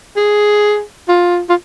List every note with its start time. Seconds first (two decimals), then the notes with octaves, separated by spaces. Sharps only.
0.17 G#4
1.08 F4
1.49 F4